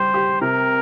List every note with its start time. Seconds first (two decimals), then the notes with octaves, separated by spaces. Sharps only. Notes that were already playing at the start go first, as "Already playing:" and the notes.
Already playing: G3 G4 C5
0.14 G4
0.41 C3 A#4